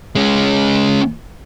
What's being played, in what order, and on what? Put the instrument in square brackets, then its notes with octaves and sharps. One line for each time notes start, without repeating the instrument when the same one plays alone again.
[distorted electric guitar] G#3 C#4